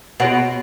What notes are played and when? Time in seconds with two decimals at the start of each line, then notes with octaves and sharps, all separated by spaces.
0.20 B2 F#4 C#5 F#5